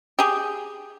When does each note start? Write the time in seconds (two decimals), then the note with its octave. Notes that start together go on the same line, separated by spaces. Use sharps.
0.19 G4 G#4